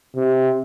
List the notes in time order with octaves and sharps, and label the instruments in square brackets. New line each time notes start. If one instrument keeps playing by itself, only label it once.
[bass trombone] C3